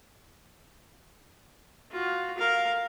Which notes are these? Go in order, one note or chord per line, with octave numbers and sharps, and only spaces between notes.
F4 F#4
A#4 F5